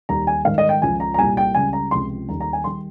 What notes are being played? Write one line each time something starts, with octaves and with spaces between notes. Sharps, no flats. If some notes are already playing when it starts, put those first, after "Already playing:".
D#2 D#3 G3 A#5
G#5
G#2 D#3 G3 F5
D#5
G5
C#2 C#3 F3 G#5
A#5
A#5
C2 A#2 G3 G#5
G5
C#2 C#3 G3 G#5
A#5
C#2 C3 F3 C6
D#2 D#3 G3 A#5
A#5
G#5
D#3 G3 C6